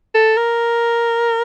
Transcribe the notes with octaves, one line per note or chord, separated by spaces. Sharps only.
A4
A#4